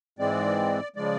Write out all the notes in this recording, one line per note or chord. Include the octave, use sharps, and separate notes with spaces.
G#2 E3 G#3 C4 D5
C#3 F3 G#3 D5